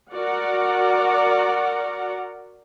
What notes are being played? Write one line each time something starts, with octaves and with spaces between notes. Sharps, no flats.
F#4 A#4 D5 F#5